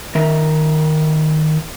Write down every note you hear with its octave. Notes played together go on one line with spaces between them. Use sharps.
D#3 A#4 E5 A#5